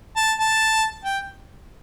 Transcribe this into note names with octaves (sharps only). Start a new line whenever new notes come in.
A5
A5
G5